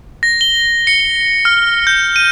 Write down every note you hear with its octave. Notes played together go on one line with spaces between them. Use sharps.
A#6
G7
C#7
F6
G6
D#7